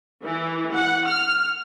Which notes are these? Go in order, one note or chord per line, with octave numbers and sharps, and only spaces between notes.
E3
F#5
F6